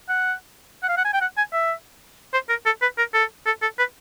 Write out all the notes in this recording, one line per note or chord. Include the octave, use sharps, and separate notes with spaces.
F#5
F#5
F5
F#5
G#5
G5
F#5
G#5
E5
C5
A#4
A4
B4
A#4
A4
A4
A4
B4